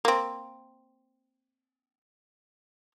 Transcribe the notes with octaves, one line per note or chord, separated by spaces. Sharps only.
A#3 C4